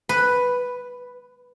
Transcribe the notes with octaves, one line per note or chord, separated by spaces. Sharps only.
B4